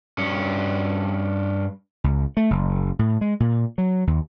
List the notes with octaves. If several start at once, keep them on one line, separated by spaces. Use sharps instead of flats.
G2 C#4
C#2
A3
F#1
A2
G#3
A#2
F#3
D#2